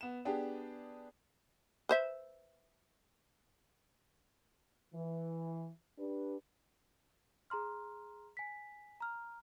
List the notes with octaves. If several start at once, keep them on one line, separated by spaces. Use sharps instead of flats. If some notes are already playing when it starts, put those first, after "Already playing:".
B3 E7
B3 D4 G4 G#4
B4 C5 E5
E3
D4 G4 B4
G#4 A#5 C6 F6
G#5 B6
A#5 F6